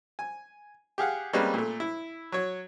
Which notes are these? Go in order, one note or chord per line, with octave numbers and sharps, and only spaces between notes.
G#5
G4 G#4 F5 F#5
G3 G#3 A#3 C4 C#4 B4
A#2 A3
E4
F#3 C#5